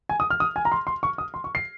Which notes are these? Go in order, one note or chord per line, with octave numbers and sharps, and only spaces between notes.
G#5
D#6
F6
D#6
G#5
A#5
C6
C6
C#6
D#6
C6
C#6
C7